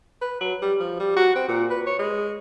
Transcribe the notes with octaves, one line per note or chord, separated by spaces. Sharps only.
B4
F#3
G3
F3
G3
F#4
C4
A#2
B4
C#5
G#3